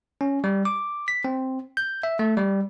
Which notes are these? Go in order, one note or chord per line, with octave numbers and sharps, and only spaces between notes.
C#4
G3
D6
B6
C4
G6
E5
A3
G3